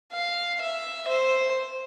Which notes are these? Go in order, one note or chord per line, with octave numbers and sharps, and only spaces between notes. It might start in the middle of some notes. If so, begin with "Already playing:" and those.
F5
E5
C5